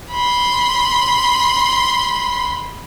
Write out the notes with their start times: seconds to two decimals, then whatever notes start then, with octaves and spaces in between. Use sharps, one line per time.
0.12 B5 C6